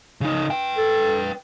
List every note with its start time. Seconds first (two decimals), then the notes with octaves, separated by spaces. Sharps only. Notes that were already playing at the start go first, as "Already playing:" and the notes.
0.21 C#3 D#4
0.50 B4 G5
0.77 A4